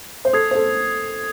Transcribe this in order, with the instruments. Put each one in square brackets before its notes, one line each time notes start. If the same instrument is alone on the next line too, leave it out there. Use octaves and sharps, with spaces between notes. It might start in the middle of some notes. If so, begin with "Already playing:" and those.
[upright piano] C5
[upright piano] A4 [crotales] D#6 G#6 C7
[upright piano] C5
A4